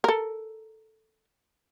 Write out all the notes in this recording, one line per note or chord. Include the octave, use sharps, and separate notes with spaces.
A4 A#4